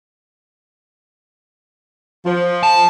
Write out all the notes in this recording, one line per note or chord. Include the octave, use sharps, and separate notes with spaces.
F3
A5